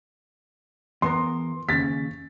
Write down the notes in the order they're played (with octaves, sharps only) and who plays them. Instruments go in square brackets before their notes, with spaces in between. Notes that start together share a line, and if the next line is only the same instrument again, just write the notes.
[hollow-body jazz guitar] E2 B3 A#4 [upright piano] C6
[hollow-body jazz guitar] D#2 C#3 [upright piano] A6 B6